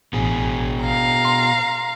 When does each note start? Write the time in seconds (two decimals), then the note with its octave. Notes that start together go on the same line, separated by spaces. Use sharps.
0.13 A1 B2 G#4
0.82 F5 A#5
1.25 C6